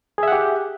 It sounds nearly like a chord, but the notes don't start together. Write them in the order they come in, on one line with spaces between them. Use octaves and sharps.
G#4 E5 F#5 G4